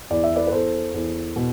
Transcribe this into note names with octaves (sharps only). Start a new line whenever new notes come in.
E2 D5
E5
B4 D5
B4
E2 A4 C5
E2
B2